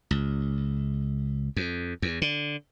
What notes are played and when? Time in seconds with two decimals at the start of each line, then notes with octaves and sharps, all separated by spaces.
0.11 C#2
1.56 F2
2.02 E2
2.22 D3